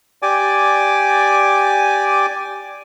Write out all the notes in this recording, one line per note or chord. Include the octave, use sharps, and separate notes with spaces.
G4 D5 G#5 D6